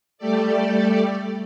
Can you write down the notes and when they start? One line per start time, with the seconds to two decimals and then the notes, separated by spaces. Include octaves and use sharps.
0.18 G3 A3 G4 A4 D5